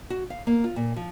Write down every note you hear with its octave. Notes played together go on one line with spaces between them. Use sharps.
F#4
F5
A#3
F4
A#2
F3